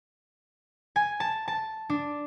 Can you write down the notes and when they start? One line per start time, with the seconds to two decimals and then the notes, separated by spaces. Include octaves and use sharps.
0.96 G#5
1.20 A5
1.48 A5
1.90 D4